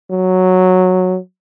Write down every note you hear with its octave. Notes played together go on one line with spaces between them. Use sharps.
F#3